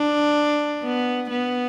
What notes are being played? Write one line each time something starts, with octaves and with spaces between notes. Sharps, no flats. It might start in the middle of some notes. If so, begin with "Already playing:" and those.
Already playing: D4
B3
B3